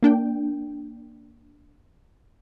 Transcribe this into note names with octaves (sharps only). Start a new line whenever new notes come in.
A#3 D4 G5